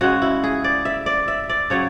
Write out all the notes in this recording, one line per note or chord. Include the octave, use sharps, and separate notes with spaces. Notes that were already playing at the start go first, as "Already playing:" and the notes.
C#3 G#3 F#4
E4
G#4
D5
E5
D5
E5
D5
C#3 F#3 C#5